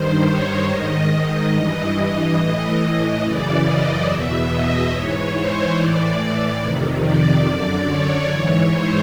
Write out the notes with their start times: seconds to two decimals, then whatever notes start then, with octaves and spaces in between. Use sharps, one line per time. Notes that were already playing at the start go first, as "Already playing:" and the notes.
Already playing: G2 D#3 C5
0.25 C#5
0.67 G#2 D#3 D#5
1.11 D#5
1.52 G2 E3
1.95 D#5
2.37 A2 E3 D#5
2.79 D#5
3.22 F#2 C#3 E3 D5
3.64 D#5
4.06 E2 B2 E5
4.49 D#5
4.91 G#2 E3 C#5
5.33 C5
5.75 A2 E3 D5
6.61 F2 C3 D#3
7.03 D5
7.45 F#2 D3 D5
7.87 C#5
8.30 G#2 E3
8.72 C5